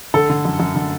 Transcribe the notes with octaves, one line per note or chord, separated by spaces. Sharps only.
D3 A4
D3
F#2
F#2
D3